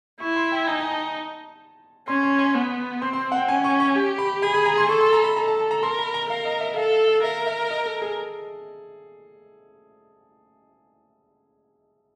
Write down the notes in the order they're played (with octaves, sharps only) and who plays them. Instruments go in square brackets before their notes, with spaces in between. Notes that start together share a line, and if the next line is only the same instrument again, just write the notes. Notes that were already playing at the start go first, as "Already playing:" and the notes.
[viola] E4 [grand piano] C#6
[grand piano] C6
G5
[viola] D#4 [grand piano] G#5
[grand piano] G#5
A5
[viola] C#4 [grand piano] C6
[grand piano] C6
C6
[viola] B3
[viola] C4 [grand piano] C6
[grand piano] C6
F#5
G5
[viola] C#4 [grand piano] G#5
[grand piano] C#6
C#6
[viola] G4
[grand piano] B5
[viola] G#4 [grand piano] B5
[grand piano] B5
A#5
C6
[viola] A4 [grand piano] C#6
[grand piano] C6
A#5
B5
[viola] A4 [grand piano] A#5
[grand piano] A5
A5
A#5
[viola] A#4 [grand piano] C6
[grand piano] B5
A#5
[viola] A#4 [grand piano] F5
[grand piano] D#5
E5
[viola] A4 [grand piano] F5
[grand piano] F5
F5
[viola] A#4 [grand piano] E5
[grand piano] E5
D#5
A4
G#4